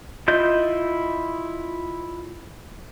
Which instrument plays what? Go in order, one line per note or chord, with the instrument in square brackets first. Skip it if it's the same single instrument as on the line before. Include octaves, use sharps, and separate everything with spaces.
[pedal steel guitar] E4 F4 D#5 G6